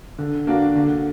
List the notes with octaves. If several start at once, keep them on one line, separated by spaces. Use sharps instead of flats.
D3
A#3 D4 F#4
D3